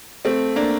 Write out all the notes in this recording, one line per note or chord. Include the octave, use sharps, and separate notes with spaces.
A3 C4
A#3 D4